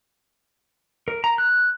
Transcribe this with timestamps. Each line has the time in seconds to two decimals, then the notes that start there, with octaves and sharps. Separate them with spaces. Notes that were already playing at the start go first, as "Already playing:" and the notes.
1.08 A#4
1.24 A#5
1.38 F#6